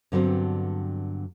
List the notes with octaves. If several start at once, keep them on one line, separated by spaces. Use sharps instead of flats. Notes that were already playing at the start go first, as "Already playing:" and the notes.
G2 D3 F#3 B3 C4